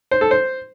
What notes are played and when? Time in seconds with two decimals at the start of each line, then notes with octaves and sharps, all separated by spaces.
0.11 C5
0.21 A4
0.31 C5